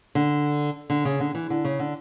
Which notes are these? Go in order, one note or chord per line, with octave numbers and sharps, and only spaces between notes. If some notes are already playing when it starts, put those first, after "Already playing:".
D3
D3
C#3
D3
E3
D3
C#3
D3